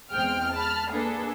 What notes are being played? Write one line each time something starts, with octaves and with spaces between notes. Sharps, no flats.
E2 G#3 C4 G5 F6
A5 B5 F6
A#3 D4 G#4 A4 B4